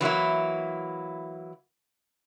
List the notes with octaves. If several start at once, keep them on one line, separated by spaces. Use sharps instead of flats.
E3 F#3 A#3 E4